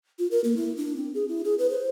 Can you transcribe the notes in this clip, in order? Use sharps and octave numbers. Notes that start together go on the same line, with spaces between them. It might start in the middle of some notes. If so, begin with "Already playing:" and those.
F4
A#4
A#3
E4
D4
C4
G#4
E4
G#4
B4
C5